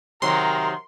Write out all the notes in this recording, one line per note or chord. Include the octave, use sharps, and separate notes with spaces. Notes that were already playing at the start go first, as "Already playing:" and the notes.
C3 D#3 F#3 A#4 C6